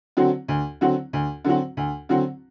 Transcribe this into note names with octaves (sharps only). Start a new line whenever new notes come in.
D3 F#3 C4 F#4
D2
D3 F#3 C4 F#4
D2
D3 F#3 C4 F#4
D2
D3 F#3 C4 F#4